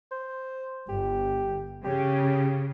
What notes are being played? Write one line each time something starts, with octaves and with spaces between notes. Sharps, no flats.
C5
G1 G4
C#3 G4